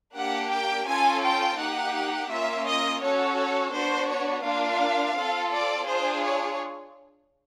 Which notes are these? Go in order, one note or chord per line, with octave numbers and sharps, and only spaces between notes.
A#3 D4 G4 F#5
G5
C#4 F4 A4 G#5
G5
A#3 D#4 G4 F#5
A#3 C#4 F4 E5
D#5
C#4 F#4 A4 C#5
C#5
B3 D4 F#4 C5
C#5
A#3 D4 F4 F5
C4 F4 A4
D5
D4 F4 G#4 C5
C#5